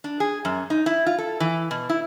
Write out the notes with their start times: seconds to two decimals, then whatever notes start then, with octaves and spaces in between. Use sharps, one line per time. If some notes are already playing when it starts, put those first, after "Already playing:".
0.04 D4
0.20 G#4
0.45 F#2
0.70 D#4
0.86 E4
1.06 F4
1.18 A4
1.40 E3
1.71 B2
1.89 E4